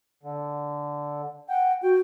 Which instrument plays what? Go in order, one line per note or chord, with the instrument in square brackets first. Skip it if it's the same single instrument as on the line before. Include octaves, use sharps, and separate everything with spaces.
[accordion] D3
[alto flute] F#5 [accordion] G5
[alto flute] F#4 [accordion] G5